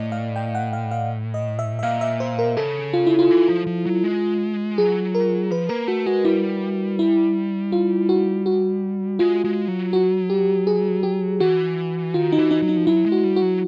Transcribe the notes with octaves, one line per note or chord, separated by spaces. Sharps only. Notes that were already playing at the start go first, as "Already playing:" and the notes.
Already playing: A2 D5 D#5
F5
G5
F#5
F5
F5
D#5
E5
E5
A#2 F5
E5
C5
A#4
C#3 A4
F4
E4
F4
E3
F3
F3
F#3
G#3
F#3 G#4
A#4
F3 B4
A#3 A#4
A3 F#4
G#3 F#4
G3 E4
E4
F4
F#4
F#4
G#3 F4
G#3
F#3
F#4
G4
G#4
G4
E3 F#4
D#3 F4
D#4
E3
D#4
F#3
D#4
F3
F#3 E4
G#3
F#4
G3
F#4
F#3